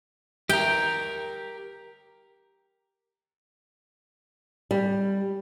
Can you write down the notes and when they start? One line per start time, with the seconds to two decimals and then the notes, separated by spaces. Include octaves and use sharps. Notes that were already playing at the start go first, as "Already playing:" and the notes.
0.49 G4 A#4 G5
4.71 G3